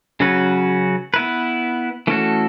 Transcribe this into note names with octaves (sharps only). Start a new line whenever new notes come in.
C#3 F#3 C#4 F#4 B4
B3 E4 B4
E3 A3 C#4 F#4 A4